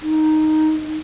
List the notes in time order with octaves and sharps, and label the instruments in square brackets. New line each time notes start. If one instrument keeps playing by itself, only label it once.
[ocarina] D#4